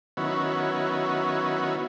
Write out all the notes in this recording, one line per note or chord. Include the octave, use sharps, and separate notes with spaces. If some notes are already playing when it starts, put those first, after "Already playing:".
D#3 F#3 B3 C#4 E4